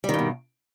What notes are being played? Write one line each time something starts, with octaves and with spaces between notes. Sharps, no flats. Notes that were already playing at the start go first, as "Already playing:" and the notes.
G2 B2 D#3 G3